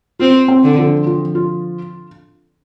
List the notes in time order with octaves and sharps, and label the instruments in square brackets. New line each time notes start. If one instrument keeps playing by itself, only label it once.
[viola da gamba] C4 [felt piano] F4
[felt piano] C4
[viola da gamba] D3
[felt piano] F3
F3
F4